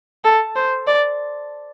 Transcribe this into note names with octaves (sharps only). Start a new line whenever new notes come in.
A4
C5
D5